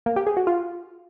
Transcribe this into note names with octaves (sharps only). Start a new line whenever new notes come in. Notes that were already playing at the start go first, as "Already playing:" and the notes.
A#3
G4
G#4
F#4
F4